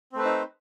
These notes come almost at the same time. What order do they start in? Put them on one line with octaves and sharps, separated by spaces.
C4 A3 B4 C5 D#4